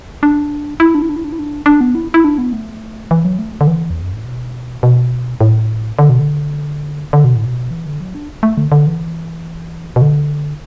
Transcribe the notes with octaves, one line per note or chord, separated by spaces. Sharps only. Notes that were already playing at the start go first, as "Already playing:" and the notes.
D4
E4
D4
E4
D4
E4
D4
E4
D4
D4
B3
E4
E4
D4
B3
A3
E3
F#3
A3
D3
E3
E2
F#2
A2
B2
B2
A2
D3
B2
D3
D3
B2
A2
B2
E3
D3
F#3
D4
A3
D3
D3
E3
B2
D3